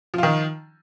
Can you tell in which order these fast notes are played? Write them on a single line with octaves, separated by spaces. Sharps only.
F3 F4 D#3